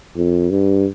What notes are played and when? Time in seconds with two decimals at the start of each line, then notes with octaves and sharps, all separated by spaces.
0.17 F2
0.50 G2